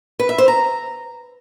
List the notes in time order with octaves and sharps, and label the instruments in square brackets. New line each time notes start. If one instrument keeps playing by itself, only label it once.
[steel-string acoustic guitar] B4
E5
C5
A#5